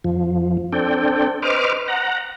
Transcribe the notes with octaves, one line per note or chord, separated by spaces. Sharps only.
F2 F3
C4 D4 A4 G5
B4 C5 D#5 D6 F6
F#5 A#5